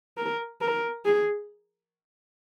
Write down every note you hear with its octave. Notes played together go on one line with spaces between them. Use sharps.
A#4
A#4
G#4